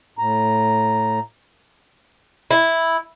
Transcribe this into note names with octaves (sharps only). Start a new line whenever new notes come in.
A2 A#5
E4